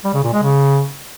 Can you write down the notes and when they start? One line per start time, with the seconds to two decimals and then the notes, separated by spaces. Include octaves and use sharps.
0.04 G3
0.14 C#3
0.23 A#2
0.33 G#3
0.42 C#3